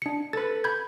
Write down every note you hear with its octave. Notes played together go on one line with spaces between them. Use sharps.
D4 C#7
A4 B4 A6
B5 G6 G#6